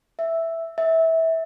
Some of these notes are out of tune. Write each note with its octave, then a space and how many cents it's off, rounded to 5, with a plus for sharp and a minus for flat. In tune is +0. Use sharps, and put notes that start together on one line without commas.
E5 +0
E5 -20